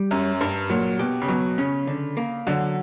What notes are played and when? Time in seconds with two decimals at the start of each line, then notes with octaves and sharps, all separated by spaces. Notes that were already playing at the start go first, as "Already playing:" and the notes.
Already playing: G3
0.11 F#2 C#4
0.41 G2 A#4
0.70 A#2 F#3
0.99 B2 G4
1.22 C#3
1.28 B2 F#3
1.58 C#3 C#4
1.87 D3
2.17 A#3
2.47 D3 F#3